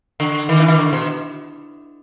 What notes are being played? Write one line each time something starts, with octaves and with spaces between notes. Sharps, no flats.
D3
D#3
E3
D#3
D3
B2